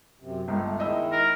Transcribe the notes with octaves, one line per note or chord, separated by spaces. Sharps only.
F#2 C3
G1 C#2 A3
D#3 G#3 E4 D#5 E5 E6
A#4